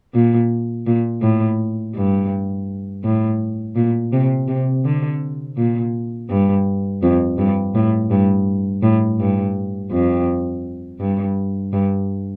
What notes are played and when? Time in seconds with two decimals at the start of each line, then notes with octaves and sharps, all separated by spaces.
0.14 A#2
0.86 A#2
1.22 A2
1.95 G2
3.04 A2
3.76 A#2
4.13 C3
4.48 C3
4.85 D3
5.57 A#2
6.30 G2
7.02 F2
7.38 G2
7.75 A2
8.11 G2
8.82 A2
9.19 G2
9.91 F2
11.00 G2
11.73 G2